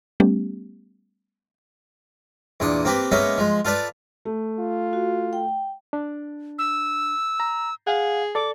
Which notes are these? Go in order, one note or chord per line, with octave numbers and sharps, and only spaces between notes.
G3 A3 B3 C#4 G4
E2 A#2 D4 D#6
A#3 C4 G4 B4
G#3 A#3 B3 C#4 E5
F3 G#3
F4 A4 B4 D5
A3
F4
F#4
G5
D4
E6
A#5
G#4 F5 F#5
A4 D5 D6